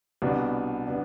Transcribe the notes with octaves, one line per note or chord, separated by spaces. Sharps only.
C2 B2 B3 D4
B2 B3 D4